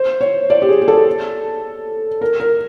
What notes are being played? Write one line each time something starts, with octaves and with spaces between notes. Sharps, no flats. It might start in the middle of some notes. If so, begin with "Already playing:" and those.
Already playing: C5
C#5
D5
G4
G#4
G#4
A4
A#4
A#4